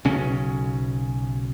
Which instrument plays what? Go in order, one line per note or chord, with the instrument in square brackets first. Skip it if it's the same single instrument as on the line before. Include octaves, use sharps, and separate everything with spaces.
[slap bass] B1 C#3 C#4